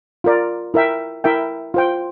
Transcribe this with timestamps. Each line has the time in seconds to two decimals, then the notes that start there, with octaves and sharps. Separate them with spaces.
0.24 F4 A#4 D5
0.74 E4 A#4 E5 G5
1.24 E4 A#4 E5 G5
1.74 F4 C5 G5